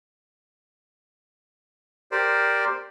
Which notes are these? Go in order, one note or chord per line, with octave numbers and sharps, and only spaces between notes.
G4 A#4 C5 D5